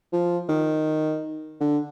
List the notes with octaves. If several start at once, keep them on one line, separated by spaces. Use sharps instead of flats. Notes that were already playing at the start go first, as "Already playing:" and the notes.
F3
D#3
D3